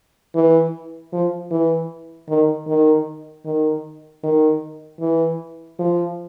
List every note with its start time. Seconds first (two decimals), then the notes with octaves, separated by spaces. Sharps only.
0.35 E3
1.13 F3
1.51 E3
2.30 D#3
2.68 D#3
3.45 D#3
4.24 D#3
5.01 E3
5.79 F3